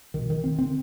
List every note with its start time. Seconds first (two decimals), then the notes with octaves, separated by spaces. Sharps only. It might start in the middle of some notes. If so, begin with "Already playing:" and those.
0.14 C2 B2 D#3
0.30 D#3
0.44 C4
0.59 D3 C4